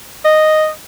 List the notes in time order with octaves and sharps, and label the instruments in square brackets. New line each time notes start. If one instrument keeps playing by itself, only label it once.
[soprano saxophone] D#5